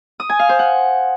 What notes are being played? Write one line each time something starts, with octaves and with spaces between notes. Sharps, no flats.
D#6
G#5
F5
C5
F#5